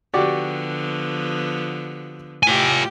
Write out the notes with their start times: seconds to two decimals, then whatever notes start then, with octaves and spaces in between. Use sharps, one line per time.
0.14 D3 F3 B3 F#4 G4 D5
2.43 A2 F4 G4 G#5